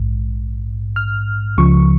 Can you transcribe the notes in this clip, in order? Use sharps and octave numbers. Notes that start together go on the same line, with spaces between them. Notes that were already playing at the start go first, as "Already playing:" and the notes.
Already playing: A#1 G#2
F6
C#2 C#3 F3 C#6